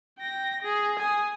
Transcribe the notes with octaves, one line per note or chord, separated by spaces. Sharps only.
G5 A#6
G#4
G#5 D#6